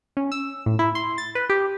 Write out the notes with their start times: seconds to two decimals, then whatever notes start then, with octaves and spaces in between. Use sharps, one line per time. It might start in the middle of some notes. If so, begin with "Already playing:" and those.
0.17 C#4
0.32 E6
0.66 A2
0.79 E4
0.95 C6
1.18 A6
1.35 B4
1.50 G4